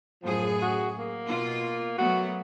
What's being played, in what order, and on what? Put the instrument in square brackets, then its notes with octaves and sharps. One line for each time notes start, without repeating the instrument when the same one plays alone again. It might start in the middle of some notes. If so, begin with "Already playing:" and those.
[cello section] F#2 A2 G#4 [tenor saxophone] F3
[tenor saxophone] F#4
A#3
[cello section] B2 F4
[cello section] F#3 A3 B3 [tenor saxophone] F#4